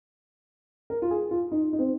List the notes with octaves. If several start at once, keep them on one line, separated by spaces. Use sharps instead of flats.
A#4
F4
G#4
F4
D#4
D#4
C4